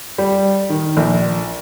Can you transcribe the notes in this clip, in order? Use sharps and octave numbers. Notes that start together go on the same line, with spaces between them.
G3
D#3
A#1